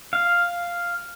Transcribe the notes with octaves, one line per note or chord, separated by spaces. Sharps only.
F5